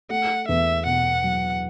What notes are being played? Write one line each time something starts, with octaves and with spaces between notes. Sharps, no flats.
A3 F#5
E2 E5
B2 F#5
F#3